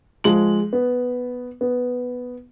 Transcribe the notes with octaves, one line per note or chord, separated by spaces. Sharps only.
F3 G#3 F#7
B3
B3